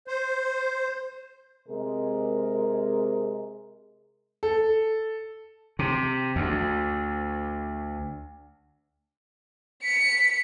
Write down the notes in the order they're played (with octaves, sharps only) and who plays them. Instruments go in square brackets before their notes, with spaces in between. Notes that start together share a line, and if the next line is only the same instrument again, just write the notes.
[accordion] C5
[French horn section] C3 G#3 G#4 A#4
[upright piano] A4
[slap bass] C3
D2
[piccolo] B6 [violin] C#7